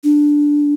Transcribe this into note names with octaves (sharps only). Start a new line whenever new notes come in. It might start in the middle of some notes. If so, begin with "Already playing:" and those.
D4